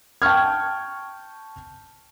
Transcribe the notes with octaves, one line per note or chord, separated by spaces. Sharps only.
G5 A5 C#6 F6 G#6